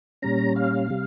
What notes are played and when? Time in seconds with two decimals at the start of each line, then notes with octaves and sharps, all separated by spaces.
0.22 A#2 G3 C#4 A#5
0.56 F5
0.90 C3 G3